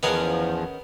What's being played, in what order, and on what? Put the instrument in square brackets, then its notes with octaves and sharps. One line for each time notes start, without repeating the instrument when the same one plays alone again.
[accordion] E2 F3 [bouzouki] D#3 C#4 F#5 [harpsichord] B3 G#4 A#4